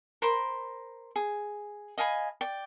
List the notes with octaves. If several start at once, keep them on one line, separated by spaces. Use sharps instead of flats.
A#4 C5 B5
G#4
D#5 F5 G#5 B5
D5 G5